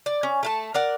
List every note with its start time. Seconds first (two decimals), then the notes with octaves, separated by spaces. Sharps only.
0.06 D5
0.23 C#4
0.43 A3 F5 A5
0.74 A#4 D5 F#5